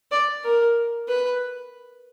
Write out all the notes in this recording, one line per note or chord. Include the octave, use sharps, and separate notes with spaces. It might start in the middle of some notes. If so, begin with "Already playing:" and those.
D5
A#4
B4